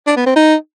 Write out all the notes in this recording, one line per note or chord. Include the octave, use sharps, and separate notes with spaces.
D4
B3
C4
D#4